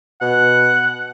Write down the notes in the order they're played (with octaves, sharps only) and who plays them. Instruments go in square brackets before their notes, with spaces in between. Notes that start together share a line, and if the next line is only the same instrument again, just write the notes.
[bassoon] B2 [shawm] F#5